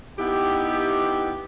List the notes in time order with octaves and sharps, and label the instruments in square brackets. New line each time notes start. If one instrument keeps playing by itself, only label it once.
[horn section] B3 D#4 E4 G4